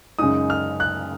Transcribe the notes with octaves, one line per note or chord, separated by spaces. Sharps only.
F#2 C#3 G#3 D#4 D#6
F6
F#6